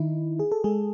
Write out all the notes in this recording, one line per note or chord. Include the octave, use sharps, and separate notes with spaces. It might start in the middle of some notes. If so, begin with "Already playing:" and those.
Already playing: D#3 D#4 E4
G#4
A4
G#3 G#4